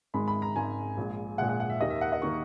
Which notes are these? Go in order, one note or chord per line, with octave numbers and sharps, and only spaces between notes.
G#1 G#2 D#3 G#3 B5
B5
A#5
G#1 G#2 D#3 G#3 G#5
A#1 A#2 G#3
A#1 A#2 G#3 F#5
F#5
F#5
E5
D#2 D#3 A#3 D#5
E5
F#5
D#5
D#3 A#3 C#6